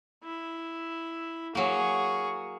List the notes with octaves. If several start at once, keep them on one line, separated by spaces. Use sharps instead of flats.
E4
F#3 A#3 G#4 C#6